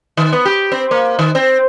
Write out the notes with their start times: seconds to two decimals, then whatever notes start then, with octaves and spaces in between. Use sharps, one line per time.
0.17 D#3
0.32 B3
0.45 G4
0.72 C4
0.91 A#3
1.19 D#3
1.35 C4